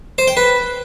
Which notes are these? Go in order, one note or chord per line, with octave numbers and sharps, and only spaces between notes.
C5
G5
B4